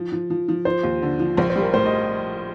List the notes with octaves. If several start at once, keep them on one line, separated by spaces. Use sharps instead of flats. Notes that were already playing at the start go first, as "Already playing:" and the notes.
Already playing: F3
F3
F3
F3
F3 C5
D#2
D3
F3
A#1 C5
C5
G3
A#4
A2 C5
D#5